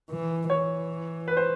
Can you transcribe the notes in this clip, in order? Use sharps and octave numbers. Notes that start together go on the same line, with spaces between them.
E3
E3 C#5
B4
C5